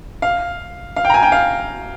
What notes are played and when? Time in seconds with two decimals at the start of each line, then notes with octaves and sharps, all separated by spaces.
0.22 F5
0.96 F5
1.05 G5
1.10 A#5
1.14 G#5
1.23 G5
1.32 F5